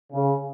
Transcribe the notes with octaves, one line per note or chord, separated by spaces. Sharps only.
C#3